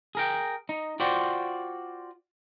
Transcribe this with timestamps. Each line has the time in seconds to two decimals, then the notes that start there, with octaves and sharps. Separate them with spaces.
0.15 G#4 A#4 G5
0.69 D#4
1.00 F4 F#4 C5 D5 G5